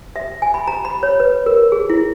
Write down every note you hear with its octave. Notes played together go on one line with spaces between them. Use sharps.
E5
G#5
B5
A#5
B5
C#5
B4
A#4
G#4
E4